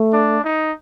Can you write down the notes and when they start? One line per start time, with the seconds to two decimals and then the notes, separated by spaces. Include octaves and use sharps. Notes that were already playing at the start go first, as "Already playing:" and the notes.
Already playing: A3
0.13 D4
0.44 D#4